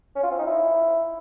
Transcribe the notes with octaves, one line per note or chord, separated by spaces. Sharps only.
C#4
F4
C4
D#4
E4